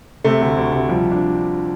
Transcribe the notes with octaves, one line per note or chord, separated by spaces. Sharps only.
C3 A3
D2
D2
C3
F3 G3
D4